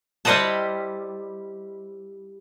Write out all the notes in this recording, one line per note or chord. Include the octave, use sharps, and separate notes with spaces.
G3 E4 C5 D#5 F#5 A5